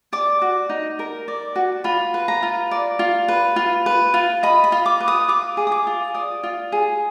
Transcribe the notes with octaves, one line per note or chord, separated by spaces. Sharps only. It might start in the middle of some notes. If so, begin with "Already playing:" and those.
D5 D6
F#4
D#4
A#4
D5
F#4
F4 B5
B4
A#5
F4
D5
F4
B4
F4
B4
F4
D#5 B5
B5
F4
D6
B4
D#6
F4 D6
G#4
D#6
D6
F4
D5 D#6
F4
G#4